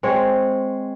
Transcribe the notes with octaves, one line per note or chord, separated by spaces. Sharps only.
G#3 C4 C#5